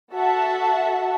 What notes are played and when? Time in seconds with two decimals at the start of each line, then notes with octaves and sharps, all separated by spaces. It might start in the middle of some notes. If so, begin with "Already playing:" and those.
0.13 F#4 A4 E5 F#5 A5